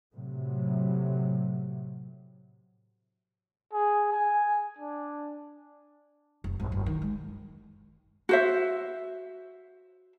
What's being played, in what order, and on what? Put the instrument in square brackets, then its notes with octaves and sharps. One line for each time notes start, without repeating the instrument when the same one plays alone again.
[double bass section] A2 C3 F#3
[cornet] G#4
G#5
D4
[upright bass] F1
G#1
F#1
D#3
G#3
[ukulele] F#4 C5 E5